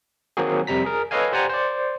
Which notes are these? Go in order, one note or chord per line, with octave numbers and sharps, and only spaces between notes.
D#3 F#3 A#3 C4 F#4 G#4
F2 C3 G3 A#5 B6
G#4 A#4
A4 B4 C#5 D#5 F5 G#5
G4 C5 D5 F#5 G#5 A#5
C5 D5